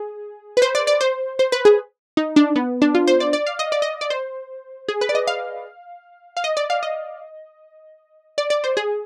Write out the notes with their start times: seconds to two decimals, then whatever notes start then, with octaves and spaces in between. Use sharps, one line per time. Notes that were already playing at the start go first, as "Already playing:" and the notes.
Already playing: G#4
0.57 B4
0.62 C5
0.75 D5
0.87 D5
1.01 C5
1.39 C5
1.52 B4
1.65 G#4
2.17 D#4
2.36 D4
2.56 B3
2.82 D4
2.95 F4
3.07 C5
3.20 D5
3.33 D5
3.46 F5
3.59 D#5
3.72 D5
3.82 D#5
4.01 D5
4.10 C5
4.88 G#4
5.01 B4
5.09 D5
5.15 D#5
5.27 F5
6.37 F5
6.44 D#5
6.57 D5
6.70 F5
6.83 D#5
8.38 D5
8.50 D5
8.64 C5
8.77 G#4